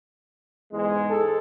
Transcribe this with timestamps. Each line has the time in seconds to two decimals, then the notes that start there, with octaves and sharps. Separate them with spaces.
0.72 E2 G#2 G#3
1.10 A4